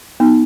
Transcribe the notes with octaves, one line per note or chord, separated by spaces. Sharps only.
B3 D#4